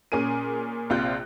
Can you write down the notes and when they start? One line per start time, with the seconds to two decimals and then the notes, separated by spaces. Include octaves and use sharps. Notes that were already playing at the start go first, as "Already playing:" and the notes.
0.12 A#2 C#4 G#4 A#4 D#7
0.90 A#1 C3 F4 F#6 G6